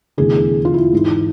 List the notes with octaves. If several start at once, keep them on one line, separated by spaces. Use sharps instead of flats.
F1 E2 D3 G#4
G#4
F4
E4
G#1 G#2 E3